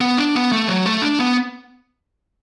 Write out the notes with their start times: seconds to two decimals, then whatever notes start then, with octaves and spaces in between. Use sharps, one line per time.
0.01 B3
0.18 D4
0.35 B3
0.52 A3
0.68 F#3
0.86 A3
1.02 D4
1.19 B3